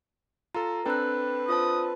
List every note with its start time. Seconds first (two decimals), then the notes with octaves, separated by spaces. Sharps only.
0.54 F4 A4 A#5
0.86 C4 D4 A4 B4 G5 F#6
1.49 F4 C5 A5 D#6